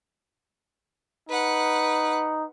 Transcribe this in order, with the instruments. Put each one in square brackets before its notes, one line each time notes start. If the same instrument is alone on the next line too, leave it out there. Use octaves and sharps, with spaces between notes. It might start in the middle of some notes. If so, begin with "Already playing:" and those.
[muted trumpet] D#4 [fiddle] B4 F#5